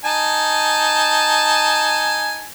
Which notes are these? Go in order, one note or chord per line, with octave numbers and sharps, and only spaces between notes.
D#4 G#5 A5